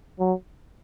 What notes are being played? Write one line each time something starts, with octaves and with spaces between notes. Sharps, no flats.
F#3